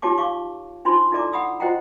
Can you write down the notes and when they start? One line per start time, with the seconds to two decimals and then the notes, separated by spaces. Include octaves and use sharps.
0.02 D#4 F4 G4 C#5 A5 D6
0.18 F5 C#6 D6
0.85 D4 D#4 F4 C5 B5 C6
1.12 D#4 E4 A4 D5 A#5 D6
1.32 F#5 B5 D#6 E6
1.60 F4 C5 D#5 F#5 G5 A#5